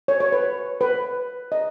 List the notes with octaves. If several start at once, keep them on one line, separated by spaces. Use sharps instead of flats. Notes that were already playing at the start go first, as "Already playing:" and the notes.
C#5
C#5
B4
B4
D#5